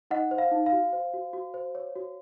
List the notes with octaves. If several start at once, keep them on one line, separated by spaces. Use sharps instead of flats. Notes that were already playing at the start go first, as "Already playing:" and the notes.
D#4 D#5 F#5
C5
F5
D#4
F5
F#4
C5
F#4
F#4
C5
C#5
F#4